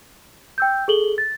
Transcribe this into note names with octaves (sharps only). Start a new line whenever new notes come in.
G5 E6 G6
G#4 A4 F#7 G7
A6